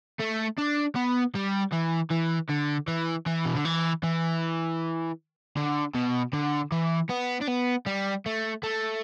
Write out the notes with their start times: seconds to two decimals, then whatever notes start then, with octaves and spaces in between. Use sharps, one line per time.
0.20 A3
0.58 D4
0.96 B3
1.35 G3
1.73 E3
2.11 E3
2.50 D3
2.88 E3
3.26 E3
3.45 B2
3.55 D3
3.65 E3
4.03 E3
5.57 D3
5.94 B2
6.33 D3
6.72 E3
7.10 B3
7.42 D4
7.48 B3
7.86 G3
8.26 A3
8.63 A3